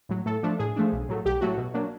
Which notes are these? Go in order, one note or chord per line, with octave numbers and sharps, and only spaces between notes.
A2 F#3
A2 A4
F3 A3 D4
A2 G#4
F3 A3 D4
B1
A2 F#3 A3
B1 G4
A2 F#3 A3 F#4
B2
F#3 A#3 D4